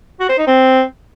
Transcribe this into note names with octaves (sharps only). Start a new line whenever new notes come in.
F#4
C5
D#4
C4